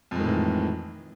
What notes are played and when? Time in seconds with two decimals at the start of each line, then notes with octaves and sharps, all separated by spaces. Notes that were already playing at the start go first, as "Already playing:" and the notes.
0.11 F2
0.15 G#3
0.19 D#3
0.24 A2
0.28 E3